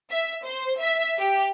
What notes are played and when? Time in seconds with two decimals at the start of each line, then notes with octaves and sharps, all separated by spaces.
0.11 E5
0.45 C5
0.81 E5
1.18 G4